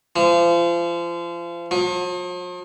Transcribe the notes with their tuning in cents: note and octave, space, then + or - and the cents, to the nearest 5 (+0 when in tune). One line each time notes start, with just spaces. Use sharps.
F3 -30
F3 +45